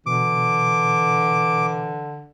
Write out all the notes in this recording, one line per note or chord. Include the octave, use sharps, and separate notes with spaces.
B2 D3 E3 D6